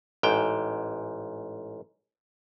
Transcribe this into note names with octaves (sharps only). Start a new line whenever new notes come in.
A1 G#2 G5